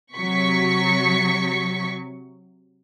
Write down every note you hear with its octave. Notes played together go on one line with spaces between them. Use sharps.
C3 F#3 C#6 B6